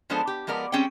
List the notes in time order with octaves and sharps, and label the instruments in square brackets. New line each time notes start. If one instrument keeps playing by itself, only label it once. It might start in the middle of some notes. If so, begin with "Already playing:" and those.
[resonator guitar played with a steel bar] F3 G#3 B3 D4 A4 C5
G4
F3 G#3 B3 A#4 D5
G3 C4 C#4 G#4 C#5 G5